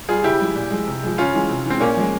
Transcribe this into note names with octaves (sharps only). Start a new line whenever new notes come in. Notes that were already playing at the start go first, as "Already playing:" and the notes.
G3 F4 G#4
C#3 E4 G4
F3 G#3
A#2
F3 G#3
C3
F3 G#3
C#3 C#4 F4
E3 G#3
C3
E3 G#3 C4
A#2 A#3 C#4
F3 G#3